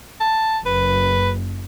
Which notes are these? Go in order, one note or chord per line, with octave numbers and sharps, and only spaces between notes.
A5
F#1 B4